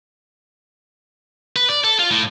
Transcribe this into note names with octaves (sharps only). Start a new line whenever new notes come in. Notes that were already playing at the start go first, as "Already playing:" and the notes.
B4
D5
A4
F4
A2